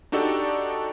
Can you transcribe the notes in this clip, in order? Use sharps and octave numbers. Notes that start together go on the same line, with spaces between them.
D4 D#4 F#4 G4 A4 D5